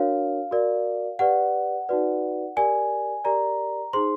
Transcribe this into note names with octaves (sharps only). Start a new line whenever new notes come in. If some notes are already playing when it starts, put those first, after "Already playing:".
Already playing: D4 F#4 A#4 C#5 F5
F#4 A#4 D5
G4 B4 D5 F#5
D#4 F#4 B4 D5
G4 A#4 D5 G#5
G4 A#4 D5 A#5
D#4 G#4 C5 C6